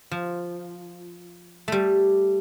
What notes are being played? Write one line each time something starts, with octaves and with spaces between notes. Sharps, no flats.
F3
G3 A3